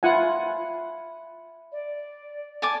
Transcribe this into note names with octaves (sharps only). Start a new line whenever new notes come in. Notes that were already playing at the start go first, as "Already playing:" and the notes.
F4 E5 F#5 G#5 B5
D5
G#5 A5 D6